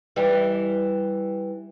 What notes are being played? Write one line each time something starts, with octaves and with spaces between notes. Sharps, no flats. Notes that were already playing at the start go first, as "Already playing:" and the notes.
E3 G3